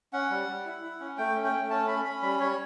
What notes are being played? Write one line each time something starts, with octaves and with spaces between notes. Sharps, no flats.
C#4 F#5
G3
G3
E4
E4
C#4
A3 G5
C#4
G5
A3
C#4 A5
C#4 B5
C#4 B5
G3 B5
G3 C#5